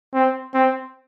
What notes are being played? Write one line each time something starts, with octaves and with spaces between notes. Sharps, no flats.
C4
C4